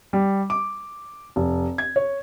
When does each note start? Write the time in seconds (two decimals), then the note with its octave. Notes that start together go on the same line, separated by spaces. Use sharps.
0.13 G3
0.50 D6
1.36 F1
1.78 G#6
1.96 C#5